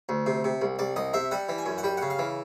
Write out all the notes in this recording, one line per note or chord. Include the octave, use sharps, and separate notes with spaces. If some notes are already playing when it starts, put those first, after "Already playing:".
D2
C3
C3
C2
C2 D5
C2 D#5
C3 E5
G3 F#5
E3
G#5
F#2
F#5
G3 G5
C#3 F#5
F5
E3